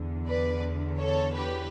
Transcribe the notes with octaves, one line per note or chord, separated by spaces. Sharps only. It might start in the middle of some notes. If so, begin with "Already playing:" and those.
Already playing: E2 D3
B4 D5
A4 C#5
G4 B4